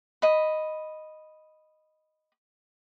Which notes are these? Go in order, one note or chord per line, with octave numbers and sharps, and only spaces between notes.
D#5 B5